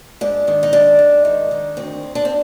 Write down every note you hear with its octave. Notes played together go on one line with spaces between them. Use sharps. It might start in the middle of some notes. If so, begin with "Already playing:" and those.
G#2 D4
D#3 D4
D#4
G#2 D4
G#2
D#3
D#3
D2 C4
D2
D4
C4